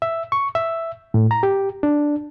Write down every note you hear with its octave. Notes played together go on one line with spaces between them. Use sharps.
E5
C#6
E5
A2
A#5
G4
D4